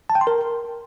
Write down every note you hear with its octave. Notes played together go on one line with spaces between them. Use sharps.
A5
G5
C6
A#4